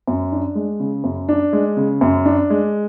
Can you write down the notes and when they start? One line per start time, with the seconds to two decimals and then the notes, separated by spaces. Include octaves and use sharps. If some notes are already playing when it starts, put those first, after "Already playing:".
0.07 F#2
0.32 D4
0.55 G#3
0.80 C#3
1.04 F#2
1.29 D4
1.53 G#3
1.77 C#3
2.01 F#2
2.25 D4
2.50 G#3